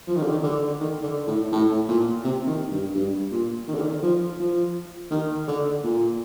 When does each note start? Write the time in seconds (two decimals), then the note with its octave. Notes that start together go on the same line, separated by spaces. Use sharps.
0.07 F3
0.16 D#3
0.23 D3
0.31 D#3
0.44 D3
0.80 D#3
1.03 D3
1.27 A2
1.52 A2
1.88 A#2
2.24 C3
2.47 D#3
2.71 G2
2.95 G2
3.31 A#2
3.68 D#3
3.75 D3
3.82 D#3
4.03 F3
4.40 F3
5.11 D#3
5.48 D3
5.84 A#2